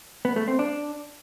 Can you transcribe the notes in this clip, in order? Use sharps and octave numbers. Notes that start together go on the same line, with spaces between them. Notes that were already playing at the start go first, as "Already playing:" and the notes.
B3
A3
C4
D4